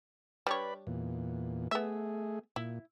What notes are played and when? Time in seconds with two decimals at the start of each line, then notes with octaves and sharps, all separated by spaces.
0.47 G3 D4 B4 C#5 D5 B5
0.87 E2 A#2
1.71 A3 B3 G#4 E5
2.56 A#2 E4